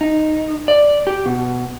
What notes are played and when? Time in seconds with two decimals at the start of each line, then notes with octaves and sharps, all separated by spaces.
0.01 D#4
0.68 D5
1.07 G4
1.26 B2